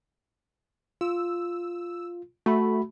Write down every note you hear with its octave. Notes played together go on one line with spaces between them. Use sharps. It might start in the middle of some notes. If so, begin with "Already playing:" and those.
F4 E6
A3 F#4 B5